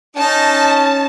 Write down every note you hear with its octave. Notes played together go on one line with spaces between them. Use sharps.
C#4 D#4 A5